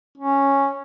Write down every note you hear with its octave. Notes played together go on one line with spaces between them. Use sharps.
C#4